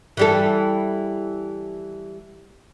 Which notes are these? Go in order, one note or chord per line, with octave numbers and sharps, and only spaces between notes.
E3 G3 A4